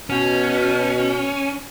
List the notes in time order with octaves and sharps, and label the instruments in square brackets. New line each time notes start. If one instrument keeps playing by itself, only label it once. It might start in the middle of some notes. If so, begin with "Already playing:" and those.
[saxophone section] B2 [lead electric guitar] C#4